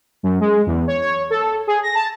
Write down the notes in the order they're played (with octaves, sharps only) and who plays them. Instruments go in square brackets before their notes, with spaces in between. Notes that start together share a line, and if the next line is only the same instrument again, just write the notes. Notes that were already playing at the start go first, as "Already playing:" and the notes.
[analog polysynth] F#2
G#3
E2
C#5
C#5
A4
G#4
A#6
A5